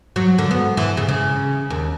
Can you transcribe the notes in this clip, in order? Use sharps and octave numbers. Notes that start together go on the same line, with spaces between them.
F#3
D3
B3
E3
C#3
C#3
D#2